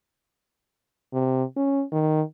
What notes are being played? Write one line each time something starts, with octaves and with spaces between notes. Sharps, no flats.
C3
C#4
D#3